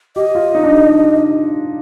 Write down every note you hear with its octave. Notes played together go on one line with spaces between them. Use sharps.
G4 D#5
F4
D#4
D4
D#4